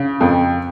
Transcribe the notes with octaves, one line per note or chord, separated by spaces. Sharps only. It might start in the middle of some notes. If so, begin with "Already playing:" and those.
Already playing: C#3
F2